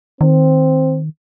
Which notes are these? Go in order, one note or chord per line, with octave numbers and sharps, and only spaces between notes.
D#3 C4